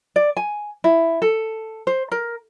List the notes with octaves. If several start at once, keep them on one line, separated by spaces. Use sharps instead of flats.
D5
G#5
E4
A4
C5
A#4